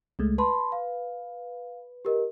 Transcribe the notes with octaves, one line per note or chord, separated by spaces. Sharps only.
C#2 G#3 A3
B4 A5 B5 C6
F5
G4 A#4 D#5